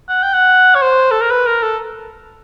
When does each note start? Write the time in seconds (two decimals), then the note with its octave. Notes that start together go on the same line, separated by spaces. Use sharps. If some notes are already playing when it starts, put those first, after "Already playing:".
0.09 F#5
0.23 G5
0.33 F#5
0.75 C#5
0.82 C5
1.11 A4
1.21 A#4
1.31 B4
1.47 A#4
1.63 A4